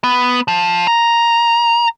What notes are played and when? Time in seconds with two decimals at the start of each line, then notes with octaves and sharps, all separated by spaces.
0.04 B3
0.48 F3
0.87 A#5